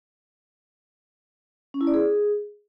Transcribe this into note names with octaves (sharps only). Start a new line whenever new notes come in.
C#4
E4
D5
G#4